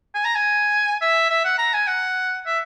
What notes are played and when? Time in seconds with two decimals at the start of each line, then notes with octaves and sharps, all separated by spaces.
0.15 G#5
0.25 A#5
0.35 G#5
1.01 E5
1.30 E5
1.44 F#5
1.58 A#5
1.74 G#5
1.88 F#5
2.46 E5